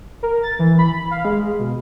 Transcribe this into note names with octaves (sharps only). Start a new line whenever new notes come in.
A#4
A6
E3
B5
F5
G#3
B2